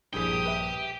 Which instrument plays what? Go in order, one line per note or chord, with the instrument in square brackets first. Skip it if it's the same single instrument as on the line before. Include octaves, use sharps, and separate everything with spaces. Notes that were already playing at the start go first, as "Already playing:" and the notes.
[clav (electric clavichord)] A#1 G2 [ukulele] E4 G#4 [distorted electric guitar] G4 G5 [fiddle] D#6
[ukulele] B4 E5